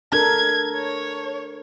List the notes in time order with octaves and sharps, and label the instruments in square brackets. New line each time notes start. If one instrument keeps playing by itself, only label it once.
[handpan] D4 A4 A#4 [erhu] G#6
[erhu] C#5